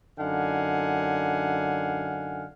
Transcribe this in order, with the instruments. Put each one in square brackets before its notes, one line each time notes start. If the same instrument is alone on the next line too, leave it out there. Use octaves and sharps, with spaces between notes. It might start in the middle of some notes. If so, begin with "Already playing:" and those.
[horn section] F#2 D3 D#4 F5 F#5 G#5